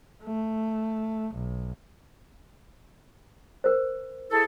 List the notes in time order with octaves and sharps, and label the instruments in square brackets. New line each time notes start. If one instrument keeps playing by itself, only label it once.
[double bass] A3
B1
[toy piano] A#4 C5
[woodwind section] E4 G#4 A4